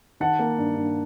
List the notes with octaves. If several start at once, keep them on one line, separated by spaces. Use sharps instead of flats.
D#3 F#5 A5
A#3
G2
G2